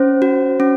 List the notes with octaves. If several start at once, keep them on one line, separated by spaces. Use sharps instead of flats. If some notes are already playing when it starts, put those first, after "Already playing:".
Already playing: C#4 C5
F#4
C#4